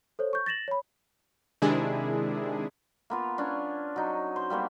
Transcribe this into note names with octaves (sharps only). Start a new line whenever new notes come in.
A4 C5 C#5
C#6 G6
A6 A#6 E7 F#7
C#5 B5
C3 D#3 G#3 D4 E4 G#4
A#3 B3 F4
B3 C#4 D4
F#3 D#4
C5
G3 A#3 B3 F#4